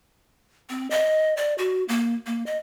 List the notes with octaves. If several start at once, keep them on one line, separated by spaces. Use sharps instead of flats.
C4
D#5
D5
F#4
A#3
A#3
D#5